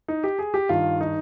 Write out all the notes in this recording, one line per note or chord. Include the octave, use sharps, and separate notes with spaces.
D#4
G4
G#4
G4
G2 D#3 F4
D#4